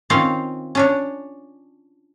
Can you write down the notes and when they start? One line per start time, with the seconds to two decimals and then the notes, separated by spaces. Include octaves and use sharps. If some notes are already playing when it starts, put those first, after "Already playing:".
0.10 D#3 C4 C#4 F4 C#5 F5
0.75 C#4 D4 C#5